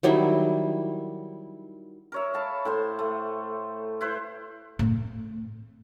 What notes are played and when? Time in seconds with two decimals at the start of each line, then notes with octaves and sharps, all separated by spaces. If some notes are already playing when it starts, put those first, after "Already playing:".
0.03 D#3 F#3 G3 E4
2.12 A#4 C#5 E5
2.34 F5 A5 B5
2.65 A2 C5 C6
2.99 A3
4.01 E4 B4 C5
4.79 A2 C4